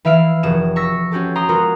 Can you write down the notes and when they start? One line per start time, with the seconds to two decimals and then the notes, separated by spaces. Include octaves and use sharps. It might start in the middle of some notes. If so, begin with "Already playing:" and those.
0.05 E3 E4 E5 F5 F6 D7
0.43 F1 F#4 G#4 E7
0.76 C#6 E6 A#6 B6
1.12 C4 C#4 F#4 G4 A4
1.36 G4 A#5 C6 D#6
1.49 G#3 B3 F4 F#4 A#4